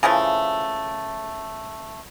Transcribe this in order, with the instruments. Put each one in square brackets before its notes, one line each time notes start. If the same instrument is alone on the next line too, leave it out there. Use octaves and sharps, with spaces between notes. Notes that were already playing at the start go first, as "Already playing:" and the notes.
[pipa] C#3 E3 F3 A3